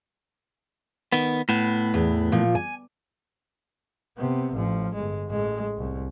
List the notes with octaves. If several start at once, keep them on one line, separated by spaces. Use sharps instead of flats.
D#3 B3
A2 B3
E2
A#2 F3
G#5
C3 B3
A1 F3
G1 G#3
A1 G#3
C2